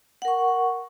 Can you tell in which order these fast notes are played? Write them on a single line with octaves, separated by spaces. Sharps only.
F#5 A#4 C#6